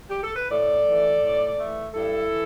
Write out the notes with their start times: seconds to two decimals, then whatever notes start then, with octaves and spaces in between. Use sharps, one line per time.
0.09 G4
0.23 A4
0.36 B4
0.50 A2 A4 D5
0.86 E3 A3
1.22 A2
1.58 E3 A3
1.94 G2 E4 A4
2.30 E3